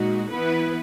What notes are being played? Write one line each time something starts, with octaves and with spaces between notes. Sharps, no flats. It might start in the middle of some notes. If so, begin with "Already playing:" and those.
Already playing: A#2 G#3 D#4 F#4
E3 B3 E4 B4